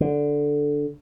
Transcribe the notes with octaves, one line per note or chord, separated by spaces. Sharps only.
D3